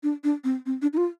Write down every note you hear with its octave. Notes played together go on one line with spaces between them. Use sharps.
D4
D4
C4
C4
D4
D#4
F4